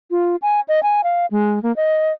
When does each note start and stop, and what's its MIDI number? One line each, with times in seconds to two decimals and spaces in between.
0.11 0.36 65
0.42 0.60 80
0.68 0.83 75
0.83 1.01 80
1.04 1.26 77
1.31 1.62 56
1.63 1.75 58
1.76 2.13 75